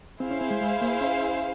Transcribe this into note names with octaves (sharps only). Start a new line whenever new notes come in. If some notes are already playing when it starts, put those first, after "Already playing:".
C4 E4 G#4 C5 F5
C#4
C4
G#3
G#3
A#3
C#4